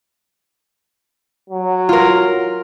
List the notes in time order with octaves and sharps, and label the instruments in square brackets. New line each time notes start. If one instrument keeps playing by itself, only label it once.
[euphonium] F#3
[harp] F4 A#4